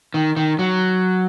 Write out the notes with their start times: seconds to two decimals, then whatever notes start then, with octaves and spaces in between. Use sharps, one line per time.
0.14 D#3
0.37 D#3
0.59 F#3